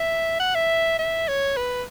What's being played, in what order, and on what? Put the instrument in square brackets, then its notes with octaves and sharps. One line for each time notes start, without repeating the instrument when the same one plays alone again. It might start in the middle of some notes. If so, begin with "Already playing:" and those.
Already playing: [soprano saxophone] E5
F#5
E5
E5
C#5
B4